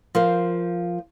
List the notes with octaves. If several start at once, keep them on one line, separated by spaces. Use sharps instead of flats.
F3 A#4 C5